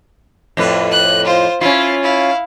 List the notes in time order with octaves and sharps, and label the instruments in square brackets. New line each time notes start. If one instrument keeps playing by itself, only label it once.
[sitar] F2 A2 B4
[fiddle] F#6
F4 C5
[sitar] C#4 F4 [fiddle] E4
[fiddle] E4 F5